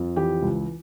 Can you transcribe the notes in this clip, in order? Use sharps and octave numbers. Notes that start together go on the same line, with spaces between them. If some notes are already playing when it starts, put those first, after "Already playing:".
Already playing: F2
E3 G4
C#2